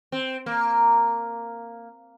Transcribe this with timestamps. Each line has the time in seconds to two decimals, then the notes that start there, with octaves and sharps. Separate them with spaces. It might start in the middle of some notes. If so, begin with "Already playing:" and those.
0.12 C4
0.46 A#3